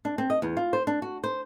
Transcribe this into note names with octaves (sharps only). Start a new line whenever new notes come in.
D4
C4
D#5
E2
F4
C5
D4
F#4
C5